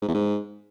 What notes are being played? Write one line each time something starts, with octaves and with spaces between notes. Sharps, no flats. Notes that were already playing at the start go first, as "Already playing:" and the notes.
G#2
E2
G#2